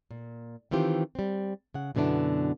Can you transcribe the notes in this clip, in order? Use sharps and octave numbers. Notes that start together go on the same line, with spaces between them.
A#2
D#3 E3 C4 F4 G4
G3 C4
C#3 F#5
F#2 B2 D3 B3 D4 E4